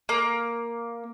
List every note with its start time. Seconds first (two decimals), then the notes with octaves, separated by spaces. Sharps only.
0.09 A#3